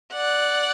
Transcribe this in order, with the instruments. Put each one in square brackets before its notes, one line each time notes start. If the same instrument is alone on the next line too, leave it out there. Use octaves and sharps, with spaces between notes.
[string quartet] D5 F#5